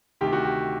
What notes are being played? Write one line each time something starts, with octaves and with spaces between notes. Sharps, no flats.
D2 C3 D#3 G4
F#4
G4